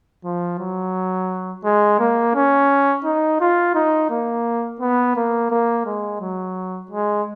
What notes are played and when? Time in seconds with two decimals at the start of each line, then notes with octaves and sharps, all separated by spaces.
0.24 F3
0.59 F#3
1.64 G#3
1.99 A#3
2.35 C#4
3.05 D#4
3.40 F4
3.74 D#4
4.10 A#3
4.80 B3
5.16 A#3
5.50 A#3
5.85 G#3
6.20 F#3
6.91 G#3